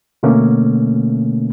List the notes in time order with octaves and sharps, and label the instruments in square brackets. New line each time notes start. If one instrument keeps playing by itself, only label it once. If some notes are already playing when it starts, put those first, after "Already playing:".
[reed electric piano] B2 D3 A3 A#3 C#4